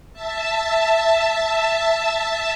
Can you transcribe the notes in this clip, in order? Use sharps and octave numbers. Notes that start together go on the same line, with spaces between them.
E5 A5